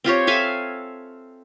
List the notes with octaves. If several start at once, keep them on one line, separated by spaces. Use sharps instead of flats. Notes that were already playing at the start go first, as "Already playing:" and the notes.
C4 F4 G4 C#5
A4 E5 F5 G#5